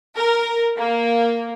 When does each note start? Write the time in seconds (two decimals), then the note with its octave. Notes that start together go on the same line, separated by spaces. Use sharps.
0.18 A#4
0.78 A#3